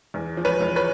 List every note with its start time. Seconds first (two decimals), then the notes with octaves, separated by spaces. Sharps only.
0.14 E2
0.37 F3
0.45 B4 C#5
0.61 E2
0.76 B4 C#5